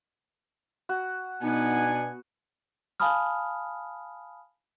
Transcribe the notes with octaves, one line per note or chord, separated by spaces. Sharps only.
F#4
B2 B3 D4 D#4 F#5 G#5
F5 G#5 A5 B5 D#6 F6